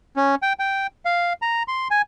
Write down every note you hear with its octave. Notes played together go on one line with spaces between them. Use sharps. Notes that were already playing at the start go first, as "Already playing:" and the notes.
C#4
G5
G5
F5
A#5
C6
G#5